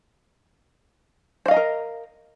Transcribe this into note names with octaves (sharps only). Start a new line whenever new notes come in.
A#4 C5 D#5 F5 A#5